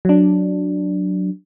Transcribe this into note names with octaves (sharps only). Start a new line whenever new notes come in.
F#3 D4